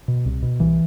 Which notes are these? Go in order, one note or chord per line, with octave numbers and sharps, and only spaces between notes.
B2
C2
B2
C2 E3